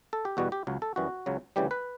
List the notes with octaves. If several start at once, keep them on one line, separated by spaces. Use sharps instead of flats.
A4
G4
E2 B2 G3 F#4
G4
C#2 C#3 F#3
A4
F#2 E3 G3 F#4
C#2 C#3 F#3
D2 C#3 E3 G3 G4
B4